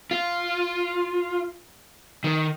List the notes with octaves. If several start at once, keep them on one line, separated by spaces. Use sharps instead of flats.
F4
D#3